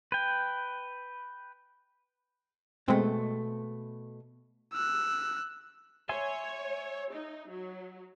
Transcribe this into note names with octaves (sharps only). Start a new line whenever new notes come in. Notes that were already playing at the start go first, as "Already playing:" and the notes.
B4 G5
B2 G#3 A3 C4
E6 F#6
C#5 E5 G#5 C6
D#4
F#3